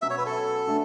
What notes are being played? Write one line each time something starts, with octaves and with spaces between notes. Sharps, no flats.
B2 F#3 C#4 G#4 E5
C#5
B4
A4
A3 D4